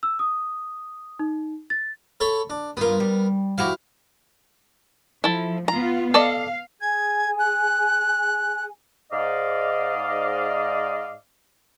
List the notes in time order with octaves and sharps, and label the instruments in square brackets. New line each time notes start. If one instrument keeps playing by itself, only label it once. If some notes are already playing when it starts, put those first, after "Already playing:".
[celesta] E6
D#6
D#4
A6
[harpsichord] A4 C#5 B5
D4
[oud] G2 F4 [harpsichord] B3 A#4
[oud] G3
[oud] F2 F#4 G4 [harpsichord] E4 F5
[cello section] F3 [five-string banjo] E4 A4
[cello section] B3 F4 [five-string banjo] A#5
[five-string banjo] A4 D5 D#5 [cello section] F5
[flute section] G#4 G#5 [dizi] G#6
[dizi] F#6
[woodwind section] G#2 D5 D#5 F5